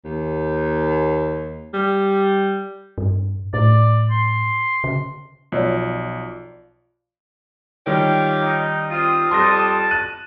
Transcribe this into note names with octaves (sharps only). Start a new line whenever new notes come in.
D#2
G3
G2
A2 D5
C6
C#3
B1 F3 C#5 D5
D#3 G3 F4 G4 C#5
D#4
C4 F4 D#6
F2 G3 A5 C6 A#6
F#6 D#7